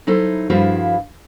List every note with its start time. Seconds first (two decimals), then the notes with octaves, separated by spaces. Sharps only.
0.07 F#3 D#4 E4 A4 C5
0.50 G2 F3 E4 F#4 C5 F5